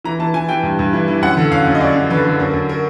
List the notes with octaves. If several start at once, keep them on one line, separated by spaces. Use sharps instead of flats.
E3 A#5
E3 A5
E3 G#5
E3 G5
G2
G2
E3
E3
F#2 F#5
D3
F#2 F5
F#2
D#5
F#2 D5
F#2
D3 B4
D3
F#2 A#4
F#2
A#4